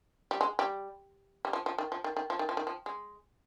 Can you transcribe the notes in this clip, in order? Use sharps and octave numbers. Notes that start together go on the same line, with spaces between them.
G3
G#3
G3
G3
F3
F3
D#3
F3
D#3
D#3
F3
D#3
F3
D#3
F3
G#3